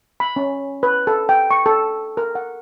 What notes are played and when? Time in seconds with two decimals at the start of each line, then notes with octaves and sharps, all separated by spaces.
0.20 B5
0.36 C#4
0.83 B4
1.07 A4
1.29 G5
1.51 C#6
1.66 A4
2.17 A#4
2.35 F#5